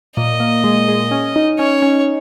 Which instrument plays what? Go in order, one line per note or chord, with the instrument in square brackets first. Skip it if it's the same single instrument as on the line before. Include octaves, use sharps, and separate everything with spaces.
[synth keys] A#2 [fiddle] D#5
[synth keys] A#3
G#3
G#3
C#4
D#4
[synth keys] C#4 [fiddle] C#5
[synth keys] C#4